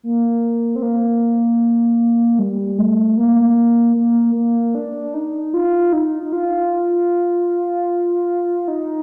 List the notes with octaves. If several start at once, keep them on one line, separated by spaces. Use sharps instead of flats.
A#3
C4
A#3
G3
A3
A#3
A#3
A#3
D4
D#4
F4
D#4
D#4
F4
D#4